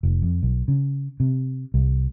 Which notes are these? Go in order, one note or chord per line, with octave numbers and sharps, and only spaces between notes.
F1
F2
B1
C#3
C3
C2